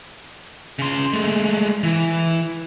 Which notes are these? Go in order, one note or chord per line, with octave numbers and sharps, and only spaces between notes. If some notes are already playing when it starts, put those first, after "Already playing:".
C#3 C6
G#3 A3
E3